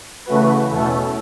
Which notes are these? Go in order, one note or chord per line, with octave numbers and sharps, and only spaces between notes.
C#3 E3 A3 F#4 B4
E2 B2 A3 C#4 A4